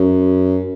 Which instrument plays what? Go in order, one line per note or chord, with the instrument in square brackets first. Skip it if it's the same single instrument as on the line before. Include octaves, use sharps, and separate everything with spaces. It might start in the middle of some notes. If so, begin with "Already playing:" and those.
Already playing: [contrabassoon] F#2